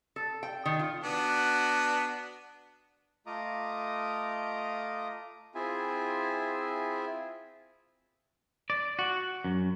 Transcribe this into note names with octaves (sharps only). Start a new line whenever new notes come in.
A4
G5
D#3
F4
B3 D4 F#4
A3 F4 D#5 A#5 D6 D#6
C4 E4 F4 G#4 E5 G#5
D5
F#4
F#2